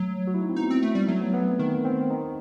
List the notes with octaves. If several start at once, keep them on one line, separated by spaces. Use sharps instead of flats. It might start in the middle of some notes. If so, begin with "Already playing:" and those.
Already playing: F#3 A3
F#4
E4
D#4
C4
B3 D#4
C4
A3
G3
F#3 A3
B3
B3
C4
D#3 D#4
C4
D#4